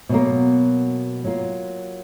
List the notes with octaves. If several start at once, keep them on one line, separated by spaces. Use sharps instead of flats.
B2 F#3 A#3
F#3 A#3 F4